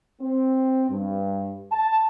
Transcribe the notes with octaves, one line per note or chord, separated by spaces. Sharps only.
C4
G2
A5